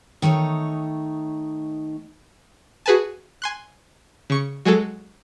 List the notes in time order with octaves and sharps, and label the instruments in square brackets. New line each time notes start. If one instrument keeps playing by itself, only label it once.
[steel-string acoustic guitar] D#3 A3 D#4 C#5
[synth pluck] F#4 G#4 B4 G#5 A5
G#5 C6 F#6
C#3 C#6 C#7
F#3 G#3 G#4 A4